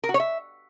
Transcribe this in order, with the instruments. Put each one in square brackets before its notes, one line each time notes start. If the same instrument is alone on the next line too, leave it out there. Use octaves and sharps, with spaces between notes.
[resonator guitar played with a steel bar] A#4
F#4
C#5
E5